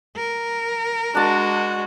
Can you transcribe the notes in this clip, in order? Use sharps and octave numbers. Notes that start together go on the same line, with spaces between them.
A#4
G#3 D4 F#4 A5